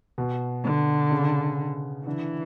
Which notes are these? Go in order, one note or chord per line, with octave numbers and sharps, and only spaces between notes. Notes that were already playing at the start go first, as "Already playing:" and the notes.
B2
D3
C#3
D3 E3